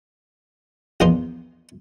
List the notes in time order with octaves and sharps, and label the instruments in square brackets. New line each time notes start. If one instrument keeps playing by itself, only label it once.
[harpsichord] A#1 E2 D#3 A#3 D#4 C5